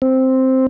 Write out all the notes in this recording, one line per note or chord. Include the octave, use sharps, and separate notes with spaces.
C4